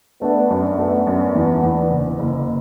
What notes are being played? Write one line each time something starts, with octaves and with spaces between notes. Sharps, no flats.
A3 B3 D4
F#2
A3 B3 D4
F#2
E2
E2
F#1
F#1